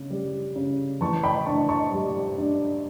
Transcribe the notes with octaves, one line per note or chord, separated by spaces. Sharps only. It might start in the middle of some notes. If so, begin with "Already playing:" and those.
Already playing: C#3
G3
C#3
E3 A5 C#6
G5 B5
D4 A5 C#6
A5 C#6
G3
D4